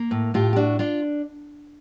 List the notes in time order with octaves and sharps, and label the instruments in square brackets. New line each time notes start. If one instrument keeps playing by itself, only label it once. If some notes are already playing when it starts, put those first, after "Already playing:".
Already playing: [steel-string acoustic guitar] A#3
A2
A2 F4 G4
G4
D4 F#4
D4 F4